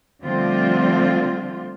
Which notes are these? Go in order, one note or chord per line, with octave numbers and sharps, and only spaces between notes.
D3 F3 G3 A3 C4 F4